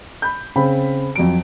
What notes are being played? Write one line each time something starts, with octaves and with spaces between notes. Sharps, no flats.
B5 G6
C#3 C4 B5
F2 F#3 D7